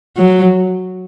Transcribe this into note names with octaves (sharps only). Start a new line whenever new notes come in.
F#3